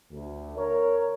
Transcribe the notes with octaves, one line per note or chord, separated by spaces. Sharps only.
D2
A#4 C#5